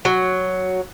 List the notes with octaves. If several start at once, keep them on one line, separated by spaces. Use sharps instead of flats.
F#3